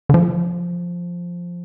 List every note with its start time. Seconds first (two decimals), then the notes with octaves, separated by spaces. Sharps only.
0.09 D3
0.14 F3